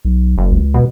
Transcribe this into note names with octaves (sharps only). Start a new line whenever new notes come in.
B1
F#1
C#2
B2